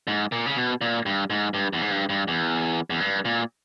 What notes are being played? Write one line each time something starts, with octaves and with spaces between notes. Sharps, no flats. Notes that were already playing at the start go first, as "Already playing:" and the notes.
G#2
A#2
C#3
B2
A#2
G2
G#2
G2
E2
G#2
G2
G2
E2
E2
G2
A#2